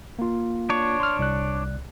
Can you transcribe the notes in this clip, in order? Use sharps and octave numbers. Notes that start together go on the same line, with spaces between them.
A#3 F4
D4 C#5
C6 F6
C2 D5 F#6